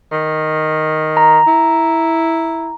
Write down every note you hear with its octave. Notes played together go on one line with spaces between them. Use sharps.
D#3
A#5
E4